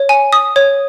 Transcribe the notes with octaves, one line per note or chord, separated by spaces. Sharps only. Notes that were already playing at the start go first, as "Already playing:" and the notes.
Already playing: C#5
G#5
D#6
C#5